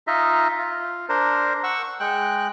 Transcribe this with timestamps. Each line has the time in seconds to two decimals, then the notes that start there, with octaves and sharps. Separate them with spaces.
0.07 D#4 F4 D#5 E5
0.59 F4
1.09 D4 A#4 C5
1.64 F#5 C#6 E6
1.84 C#6
2.00 G#3 G5 F#6